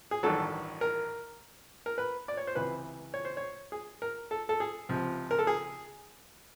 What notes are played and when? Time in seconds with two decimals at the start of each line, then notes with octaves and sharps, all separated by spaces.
0.11 G#4
0.23 A1 G2 D#3 F#3 A4
0.81 A#4
1.86 A#4
1.98 B4
2.28 D5
2.37 C#5
2.47 C5
2.55 C#2 C3 E3 B4
3.14 C#5
3.25 C5
3.37 C#5
3.72 G#4
4.02 A#4
4.31 A4
4.49 A4
4.60 G#4
4.89 C#2 C3 F3
5.31 A#4
5.39 A4
5.47 G#4